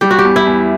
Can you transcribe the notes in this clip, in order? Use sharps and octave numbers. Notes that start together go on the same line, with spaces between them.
G3 G4
F#4
G4
E2
E4
E2